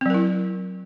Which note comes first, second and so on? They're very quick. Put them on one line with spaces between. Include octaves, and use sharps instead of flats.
C4 F#3 A#4 E4